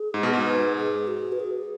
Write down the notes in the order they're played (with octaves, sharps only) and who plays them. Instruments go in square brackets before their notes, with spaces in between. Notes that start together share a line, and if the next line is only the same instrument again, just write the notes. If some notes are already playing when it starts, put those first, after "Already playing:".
Already playing: [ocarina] G#4
[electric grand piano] G#2
B2
G#2
[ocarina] B4
G#4
F#4
B4
G#4